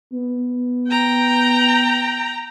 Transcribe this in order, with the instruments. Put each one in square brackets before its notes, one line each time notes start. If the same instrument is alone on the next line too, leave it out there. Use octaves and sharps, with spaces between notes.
[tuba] B3
[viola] G5 A#5